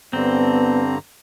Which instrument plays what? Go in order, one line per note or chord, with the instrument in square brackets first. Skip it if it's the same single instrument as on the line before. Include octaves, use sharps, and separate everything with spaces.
[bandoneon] G2 D3 A#5 [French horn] B3 [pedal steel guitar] C4